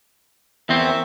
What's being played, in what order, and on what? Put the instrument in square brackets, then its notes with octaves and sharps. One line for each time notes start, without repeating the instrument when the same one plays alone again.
[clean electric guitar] E2 C4 [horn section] A#4 C#5 E5